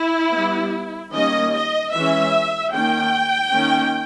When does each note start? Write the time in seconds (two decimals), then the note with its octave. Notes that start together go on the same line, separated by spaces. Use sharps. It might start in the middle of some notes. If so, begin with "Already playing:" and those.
Already playing: E4
0.34 G3 B3
1.14 D#3 G3 A#3 C#4 D#5
1.55 D#5
1.94 E3 G#3 C#4 E5
2.74 D#3 A#3 C#4 G5
3.54 D#3 A#3 C#4